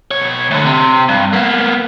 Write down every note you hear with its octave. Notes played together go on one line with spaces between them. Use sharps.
B2 C#5
D2 D3
C3
G2
A#3 B3